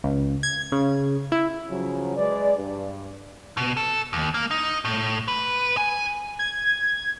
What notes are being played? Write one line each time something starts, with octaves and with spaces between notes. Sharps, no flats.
C#2
G#6
C#3
E4
C#3 F3 F#3
G#3 B4 D5
G2
B2
A4
D#2
A#3
D#4
A2
B4
G#5
G#6